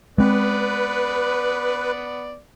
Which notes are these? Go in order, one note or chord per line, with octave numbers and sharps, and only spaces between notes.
G#3 B3 C4 B4 D5